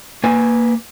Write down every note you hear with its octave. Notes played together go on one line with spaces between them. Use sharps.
A#3 B4 G#5